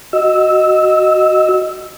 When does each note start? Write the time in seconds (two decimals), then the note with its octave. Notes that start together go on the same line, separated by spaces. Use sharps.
0.13 F#4 D#5 E6